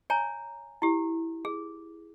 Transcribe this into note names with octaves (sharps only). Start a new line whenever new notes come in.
C#5 G#5 A#5
E4 G4
G#4